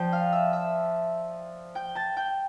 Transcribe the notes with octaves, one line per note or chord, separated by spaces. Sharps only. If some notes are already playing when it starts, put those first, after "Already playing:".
Already playing: F3 D5 G5 A5 G6
F5 F6
E5 E6
E5 E6
G5 G6
A5 A6
G5 G6